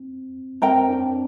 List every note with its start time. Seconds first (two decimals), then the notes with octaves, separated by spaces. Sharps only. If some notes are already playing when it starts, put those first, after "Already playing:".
Already playing: C4
0.62 C4 A#4 G5 A#5
0.89 D4